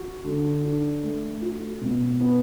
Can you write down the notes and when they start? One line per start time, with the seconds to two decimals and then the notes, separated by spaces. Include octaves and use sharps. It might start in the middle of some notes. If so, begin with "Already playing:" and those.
Already playing: F#4
0.24 D3
0.64 D4
1.03 A3
1.42 F#4
1.81 B2
2.20 B3